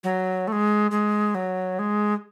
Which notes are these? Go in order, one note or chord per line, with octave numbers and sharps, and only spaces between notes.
F#3
A3
G#3
G#3
F#3
G#3